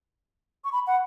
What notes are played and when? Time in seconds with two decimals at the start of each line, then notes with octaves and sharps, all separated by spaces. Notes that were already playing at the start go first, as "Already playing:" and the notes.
0.64 C#6
0.72 B5
0.87 F#5